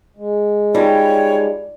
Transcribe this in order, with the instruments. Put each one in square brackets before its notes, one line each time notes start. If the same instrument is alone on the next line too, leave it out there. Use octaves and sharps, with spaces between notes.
[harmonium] G#3
[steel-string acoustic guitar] G3 [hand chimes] D#4 F4 [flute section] C#5 G5